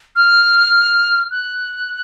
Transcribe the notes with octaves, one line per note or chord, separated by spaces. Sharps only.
F6
F#6